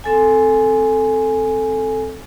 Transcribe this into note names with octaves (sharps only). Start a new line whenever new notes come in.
C4 A4 G#5